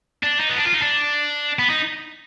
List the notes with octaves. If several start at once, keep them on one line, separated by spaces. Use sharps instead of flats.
D4
D#4
B3
D4
F4
D#4
D4
B3
D#4